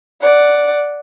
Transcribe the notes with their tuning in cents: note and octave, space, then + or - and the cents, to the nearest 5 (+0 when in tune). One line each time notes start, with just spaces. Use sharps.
D5 +0 F#5 +0